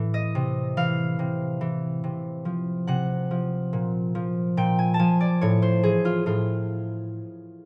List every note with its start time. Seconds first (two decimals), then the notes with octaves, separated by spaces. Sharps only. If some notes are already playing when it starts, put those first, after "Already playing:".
Already playing: A2 E3
0.14 D#5
0.35 C3
0.77 E3 F5
1.19 C3
1.61 E3
2.04 C3
2.45 F3
2.87 C3 F#5
3.31 F3
3.73 A#2
4.15 F3
4.57 A#2 G5
4.79 G#5
4.94 A5
4.99 F3 G#5
5.20 D5
5.41 A2 C#5
5.62 C5
5.83 E3 G#4
6.05 F4
6.26 A2 F4